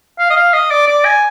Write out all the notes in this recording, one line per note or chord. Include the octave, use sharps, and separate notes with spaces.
F5
D#5
F5
D#5
D5
D5
G#5